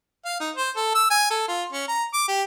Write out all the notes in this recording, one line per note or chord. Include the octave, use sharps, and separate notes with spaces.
F5
D#4
C5
A4
E6
G#5
A4
F4
C#4
A#5
D6
G4